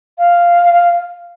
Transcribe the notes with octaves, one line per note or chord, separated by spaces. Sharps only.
F5